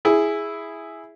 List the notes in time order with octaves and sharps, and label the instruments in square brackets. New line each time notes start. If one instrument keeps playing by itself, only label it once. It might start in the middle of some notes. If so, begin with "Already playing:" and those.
[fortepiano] E4 G#4